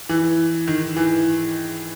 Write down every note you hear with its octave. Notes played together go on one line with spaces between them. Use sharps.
E3
D#3
E3